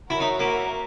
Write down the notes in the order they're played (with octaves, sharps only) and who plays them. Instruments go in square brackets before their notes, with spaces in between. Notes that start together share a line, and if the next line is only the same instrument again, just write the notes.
[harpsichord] E4 [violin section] F#4 A#4 C#5 E5
[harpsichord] D#4
A#3